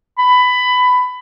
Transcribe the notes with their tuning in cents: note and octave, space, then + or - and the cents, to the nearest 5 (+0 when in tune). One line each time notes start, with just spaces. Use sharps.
B5 +15